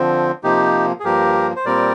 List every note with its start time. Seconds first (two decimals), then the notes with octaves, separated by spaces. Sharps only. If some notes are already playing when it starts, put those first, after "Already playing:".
Already playing: D3 F3 C4
0.44 C3 F3 A#3 D#4 G4
1.00 G#4
1.04 G2 F3 A#3 G4 A#4
1.56 C5
1.65 A#2 G3 C4 A#4 D5